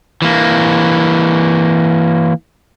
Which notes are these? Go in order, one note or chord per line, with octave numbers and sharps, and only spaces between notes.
E3 A#3